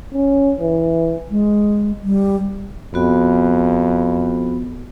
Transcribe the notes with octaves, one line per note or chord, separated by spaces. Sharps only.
C#4
E3
G#3
G3
F2 B3 F#4 B5